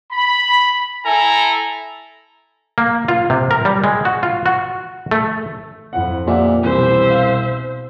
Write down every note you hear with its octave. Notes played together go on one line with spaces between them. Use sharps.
B5
E4 A4 G#5 A#5
A#3
F4
C3
A#4
G3
G#3
F#4
F4
F#4
A3
F2 E4 F#5
A#2 G4 E5 F#5
C2 B2 E3 E4 G4 C5 E5
F5